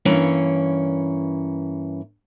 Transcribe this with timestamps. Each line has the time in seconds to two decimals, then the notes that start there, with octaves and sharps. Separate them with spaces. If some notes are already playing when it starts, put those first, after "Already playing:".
0.05 G2 E3 A#3 C#4 C#5